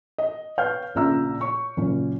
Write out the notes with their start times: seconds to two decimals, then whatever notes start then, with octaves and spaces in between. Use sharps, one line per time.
0.18 D#5
0.58 B4 C#5 F5 F6 G6
0.95 A#1 A#2 C#3 E5 A#5 E6
1.41 C#5 C#6
1.77 F#1 A#2 C#4